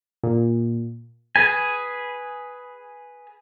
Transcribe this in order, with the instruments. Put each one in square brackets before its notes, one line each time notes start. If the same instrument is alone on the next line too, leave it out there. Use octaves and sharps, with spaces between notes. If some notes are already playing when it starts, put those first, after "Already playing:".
[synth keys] A#2
[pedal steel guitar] G#4 B4 G#5